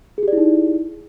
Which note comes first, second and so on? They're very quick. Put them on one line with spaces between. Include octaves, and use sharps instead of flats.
G#4 G4 D5 E4 D#4